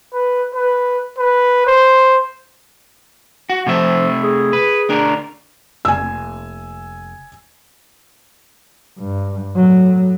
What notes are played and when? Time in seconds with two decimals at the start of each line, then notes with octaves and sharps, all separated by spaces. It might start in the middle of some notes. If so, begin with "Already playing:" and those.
0.13 B4
0.54 B4
1.18 B4
1.67 C5
3.50 F#4
3.66 C3 F3 A3 E5
4.23 G#4
4.53 B4
4.89 D2 D4 A#4
5.85 F1 A#3 G#5 E6
8.99 G2
9.56 A2 F#3